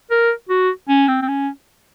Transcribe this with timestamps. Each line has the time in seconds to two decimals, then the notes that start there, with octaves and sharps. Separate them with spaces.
0.10 A#4
0.49 F#4
0.89 C#4
1.08 C4
1.22 C4
1.28 C#4